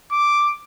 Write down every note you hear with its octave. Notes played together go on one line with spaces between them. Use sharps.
D6